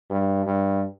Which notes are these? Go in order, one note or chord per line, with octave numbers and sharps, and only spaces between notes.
G2
G2